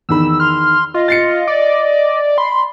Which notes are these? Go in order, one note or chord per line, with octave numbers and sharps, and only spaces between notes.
E2 D#3 B5 E6
C6 F6
F4 D#5
A6 C7 C#7
D5
B5 C6